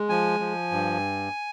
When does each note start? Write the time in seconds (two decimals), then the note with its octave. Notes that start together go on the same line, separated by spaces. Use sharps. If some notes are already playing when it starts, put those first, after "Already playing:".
Already playing: G#3
0.09 F3 G#5
0.40 F3
0.72 G2